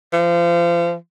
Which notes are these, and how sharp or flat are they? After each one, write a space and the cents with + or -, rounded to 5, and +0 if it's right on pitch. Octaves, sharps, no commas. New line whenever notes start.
F3 -30